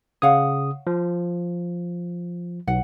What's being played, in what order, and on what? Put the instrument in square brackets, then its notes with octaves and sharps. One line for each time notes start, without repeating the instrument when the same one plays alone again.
[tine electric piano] C#3 D#6 [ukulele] C#5 F5 F#5
[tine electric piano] F3
[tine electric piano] B1 [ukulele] F#5